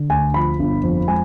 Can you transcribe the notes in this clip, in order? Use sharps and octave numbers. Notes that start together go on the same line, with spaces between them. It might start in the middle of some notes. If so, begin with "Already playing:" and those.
Already playing: D3
D2 G#5
F3 B5
G1
F2
G#3 G#5